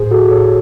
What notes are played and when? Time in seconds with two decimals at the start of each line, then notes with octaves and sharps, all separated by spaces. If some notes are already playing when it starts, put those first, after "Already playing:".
Already playing: A2 G#4 C5
0.11 F#4 A4
0.30 A2 A4 C#5